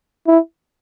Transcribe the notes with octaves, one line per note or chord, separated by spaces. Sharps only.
E4